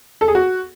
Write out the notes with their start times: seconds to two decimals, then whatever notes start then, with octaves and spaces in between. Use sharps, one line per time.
0.21 A4
0.28 G#4
0.35 F#4